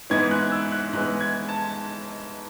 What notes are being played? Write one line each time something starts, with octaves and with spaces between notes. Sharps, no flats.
G#2 E3 G#3 B3 G#6
F#6
F#6
E6
F#6
G#2 E3 G#3 B3 F#6
G#6
A5